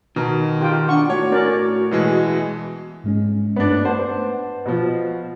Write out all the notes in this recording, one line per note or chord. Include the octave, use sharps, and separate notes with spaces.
B2 D#3 A#4
F4 G4 G5
D4 F#5 C#6
A2 F#4 C#5
C#4 A#4 D5
B2 E3 G#3
G#2 G#3 C#4
G2 A3 B3 D4
B4 C5 F#5 A5
B2 F3